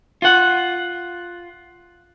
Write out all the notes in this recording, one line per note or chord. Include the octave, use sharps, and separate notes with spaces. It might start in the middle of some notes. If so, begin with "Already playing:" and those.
F4 F#5